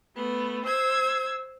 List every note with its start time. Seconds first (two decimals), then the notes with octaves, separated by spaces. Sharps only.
0.15 A3 B3
0.65 C5 E6 G#6